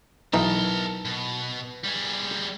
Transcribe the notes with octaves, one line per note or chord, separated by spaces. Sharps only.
B1 E3 D#4 A#4 A5
B2
G3 G#4